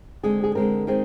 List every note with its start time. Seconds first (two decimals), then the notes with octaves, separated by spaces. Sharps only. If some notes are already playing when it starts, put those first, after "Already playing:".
0.23 D3 G#3 C4 G#4
0.44 G#4
0.55 D3 G#3 C4 A#4
0.87 D#3 G#3 C4